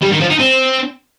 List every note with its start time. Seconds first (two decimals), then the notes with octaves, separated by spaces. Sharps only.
0.02 G3
0.11 D#3
0.21 F3
0.30 D#4
0.39 C4